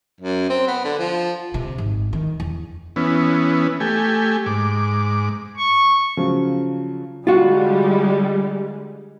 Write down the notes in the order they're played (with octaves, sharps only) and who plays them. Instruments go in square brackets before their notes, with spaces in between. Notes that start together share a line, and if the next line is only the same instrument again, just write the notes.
[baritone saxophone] F#2
C4
B3
D3
F3
[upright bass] C3
G#1
D#3
E2
[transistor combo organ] E3 B3 C#4
A3 G4 G#5
G#2 D6
[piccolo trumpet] C#6
[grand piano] C#3 F3 F#3
[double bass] D3 G#3 [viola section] G3 [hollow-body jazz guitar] F4 F#4